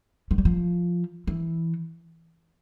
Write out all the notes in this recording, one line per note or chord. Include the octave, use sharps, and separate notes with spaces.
F3
G3
F3
E3